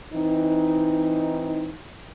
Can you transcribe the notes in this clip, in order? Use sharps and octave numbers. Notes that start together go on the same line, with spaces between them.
E3 C4 D#4